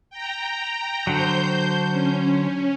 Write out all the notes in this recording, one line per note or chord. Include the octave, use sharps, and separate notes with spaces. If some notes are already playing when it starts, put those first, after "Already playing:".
G5 A#5
D3 F#3 C5 G6
C#4